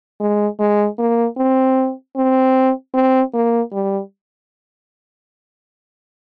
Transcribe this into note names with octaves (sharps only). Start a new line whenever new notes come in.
G#3
G#3
A#3
C4
C4
C4
A#3
G3